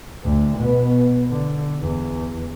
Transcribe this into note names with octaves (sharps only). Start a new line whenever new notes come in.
D2
B2 B3
D3
E2